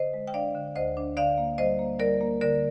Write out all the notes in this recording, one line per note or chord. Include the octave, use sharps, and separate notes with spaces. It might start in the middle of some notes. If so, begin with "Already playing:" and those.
Already playing: D3 C5 D#5
G#3
G5
D4 D5 F5
D3
D2 C5 D#5
D4
D3 D5 F5
A#3
G3 C5 D#5
A#3
G3 A#4 D5
A#3
D3 A#4 D5